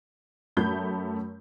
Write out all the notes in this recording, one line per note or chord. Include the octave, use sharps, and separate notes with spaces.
F#2 A3 B5 G6